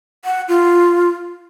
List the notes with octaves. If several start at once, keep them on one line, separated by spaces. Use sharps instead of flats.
F#5
F4